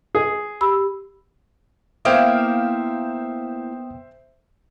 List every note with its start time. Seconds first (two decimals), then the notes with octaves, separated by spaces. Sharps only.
0.15 G#4
0.61 G4 B5 E6
2.05 A#3 B3 E4 C5 E5 F5 G5 D#6